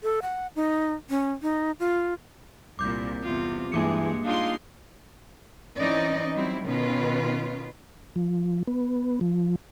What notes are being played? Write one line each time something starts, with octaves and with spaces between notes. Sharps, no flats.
A4
F#5
D#4
C#4
D#4
F4
C2 A#2 D6 G6
E2 C3 F4
G2 E3 G#3 A#3 D6 C#7
G#3 D4 D#4 F4 F5 C6
E3 C4 C#4 D#4 D5 D#5
F#3 G3 C4 E4
B2 D#3 C#4 F4 B4
F3
B3
F3